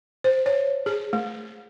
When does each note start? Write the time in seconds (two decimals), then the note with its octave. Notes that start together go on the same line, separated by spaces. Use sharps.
0.24 C5
0.46 C#5
0.86 G#4
1.13 A3